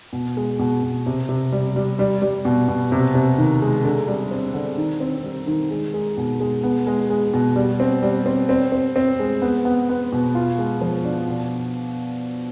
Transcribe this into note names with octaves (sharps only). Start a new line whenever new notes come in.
B2
G#3
B2
B2
C3
C3
G3
G3
G3
G3
B2
B2
C3
C3
D#3
G#3
D3
G3
C4
D3
D#3
C4
G3
D#3
G#3
G#3
B2
G#3
B3
G#3
G#3
B2
G3
C4
G3
C4
C4
C4
C4
G#3
B3
B3
B3
B2
F4
G#3
F3
D4
B2